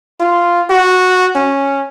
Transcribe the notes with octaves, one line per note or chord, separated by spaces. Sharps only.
F4
F#4
C#4